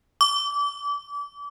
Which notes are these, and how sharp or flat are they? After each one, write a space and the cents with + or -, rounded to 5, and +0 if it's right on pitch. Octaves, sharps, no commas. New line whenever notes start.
D6 -30